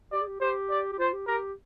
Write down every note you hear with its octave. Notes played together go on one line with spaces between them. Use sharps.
G4 D5
G#4
G4
G4 C5
D5
G4
F4 C5
G4
G4 A#4